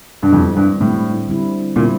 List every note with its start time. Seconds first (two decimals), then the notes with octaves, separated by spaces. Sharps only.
0.22 G2
0.32 F2 D3 G3 C4 E4
0.56 G2
0.80 A2 D3 G3 C4 E4
1.28 D3 G3 C4 E4
1.76 A#2 D3 G3 C4 E4